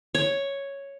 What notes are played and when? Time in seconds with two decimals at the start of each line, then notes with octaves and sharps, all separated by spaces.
0.15 C#5